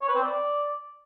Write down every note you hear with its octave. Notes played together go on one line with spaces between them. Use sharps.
C#5
B4
C4
D5